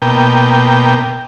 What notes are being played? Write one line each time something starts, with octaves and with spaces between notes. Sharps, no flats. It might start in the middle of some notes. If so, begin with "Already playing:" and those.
B2 A#3 G5